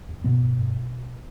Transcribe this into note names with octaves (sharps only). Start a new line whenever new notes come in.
E2
G2 B2 B3
G2
G2